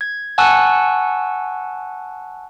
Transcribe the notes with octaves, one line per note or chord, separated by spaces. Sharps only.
G#6
F#5 G#5 A5 C#6 E6 F#6